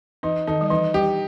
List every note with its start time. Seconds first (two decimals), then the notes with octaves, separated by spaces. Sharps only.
0.23 E3 D#4
0.47 D#3 D#4
0.61 G3
0.70 E3 D#4
0.94 G3 G4